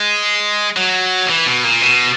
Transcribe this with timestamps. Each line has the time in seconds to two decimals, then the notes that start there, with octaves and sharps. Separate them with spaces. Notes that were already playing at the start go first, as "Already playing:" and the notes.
Already playing: G#3
0.77 F#3
1.29 E3
1.46 B2
1.64 A#2
1.82 B2